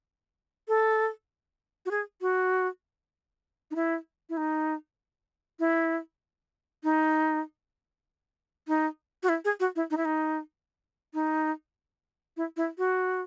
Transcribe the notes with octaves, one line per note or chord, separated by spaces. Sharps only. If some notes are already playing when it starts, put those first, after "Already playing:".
A4
F#4
G#4
F#4
D#4
E4
E4
D#4
E4
D#4
D#4
F#4
E4
G#4
F#4
E4
D#4
E4
D#4
D#4
E4
E4
F#4